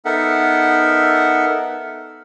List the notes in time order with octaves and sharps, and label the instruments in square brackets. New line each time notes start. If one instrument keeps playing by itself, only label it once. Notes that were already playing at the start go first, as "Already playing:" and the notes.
[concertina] B3 D#4 A4 A#4 E5 F#5